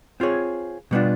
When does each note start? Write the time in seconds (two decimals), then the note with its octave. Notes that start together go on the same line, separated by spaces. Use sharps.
0.20 C4 F4 G#4 C#5
0.91 B2 G3 B3 D4 F4